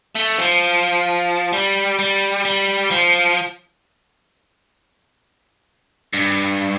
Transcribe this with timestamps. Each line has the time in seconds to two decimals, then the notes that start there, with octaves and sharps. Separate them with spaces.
0.15 A3
0.38 F3
1.53 G3
1.99 G3
2.45 G3
2.91 F3
6.13 G2